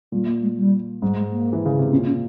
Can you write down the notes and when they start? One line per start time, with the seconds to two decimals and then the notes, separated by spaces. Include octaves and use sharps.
0.12 A#2 G3
0.28 A#3
0.43 G#3
0.57 G3
1.02 G#2 G3
1.16 G#3
1.32 A#3
1.53 E3
1.65 C#3
1.79 C3
1.91 A#2 C#4
2.06 C#4